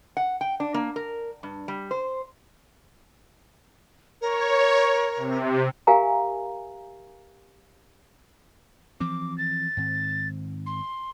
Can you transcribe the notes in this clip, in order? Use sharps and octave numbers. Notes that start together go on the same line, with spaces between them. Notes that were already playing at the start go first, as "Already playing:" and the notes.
F#5
G5
D4
A#3
A#4
G2
G3
C5
A#4 C#5
C3
G4 A#4 E5 F5 G#5 A#5
E3 F3 C4 D6
A6
G#2 D#3 C4
C6